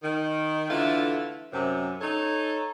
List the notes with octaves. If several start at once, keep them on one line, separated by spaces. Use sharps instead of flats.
D#3
D3 E3 A3 E4 F4
F#2 C3
D#4 A4 C#5